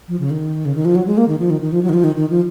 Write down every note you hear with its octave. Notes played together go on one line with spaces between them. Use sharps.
F3
C#3
D#3
C#3
D#3
F3
F#3
G#3
A#3
D#3
F3
D#3
D#3
F3
F#3
D#3
F3
D#3
D#3
F3